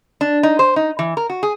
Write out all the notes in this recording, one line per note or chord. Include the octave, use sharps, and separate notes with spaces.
D4
D#4
C5
D#4
E3
A#4
F#4
G#4